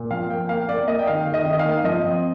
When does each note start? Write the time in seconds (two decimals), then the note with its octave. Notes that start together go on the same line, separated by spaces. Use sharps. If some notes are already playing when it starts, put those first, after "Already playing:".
Already playing: A#2
0.11 F3 F5
0.29 A#3 G5
0.49 A#3 F5
0.69 A#3 D5
0.88 A#3 D#5
0.99 G5
1.07 D#3 F5
1.27 D#3
1.34 D#5
1.45 D#3
1.53 D#5
1.59 F5
1.65 A#3
1.84 F3 D#5
2.03 C4